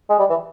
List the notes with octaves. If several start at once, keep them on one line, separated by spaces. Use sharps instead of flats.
G#3
G3
E3